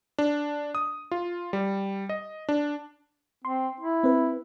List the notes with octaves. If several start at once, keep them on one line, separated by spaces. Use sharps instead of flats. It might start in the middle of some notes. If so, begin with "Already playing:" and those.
D4
D#6
F4
G3
D#5
D4
C4 C6
E4
C4 B4